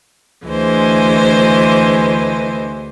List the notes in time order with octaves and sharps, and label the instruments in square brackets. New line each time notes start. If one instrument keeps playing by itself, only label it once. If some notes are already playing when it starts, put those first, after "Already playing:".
[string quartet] D2 E3 G#3 C5